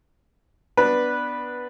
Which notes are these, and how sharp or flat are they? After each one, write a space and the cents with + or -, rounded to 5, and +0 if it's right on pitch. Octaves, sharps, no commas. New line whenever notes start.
B3 +0 D4 +0 B4 -10